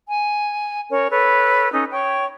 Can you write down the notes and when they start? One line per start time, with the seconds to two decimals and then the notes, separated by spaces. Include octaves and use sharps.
0.08 G#5
0.90 C#4 A#4 C#5
1.11 A4 B4 C#5
1.72 C#4 D#4 A4
1.91 C#5 G5 C#6